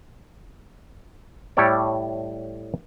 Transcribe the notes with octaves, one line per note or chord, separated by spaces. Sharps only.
A2 G3 A4 C#5 D5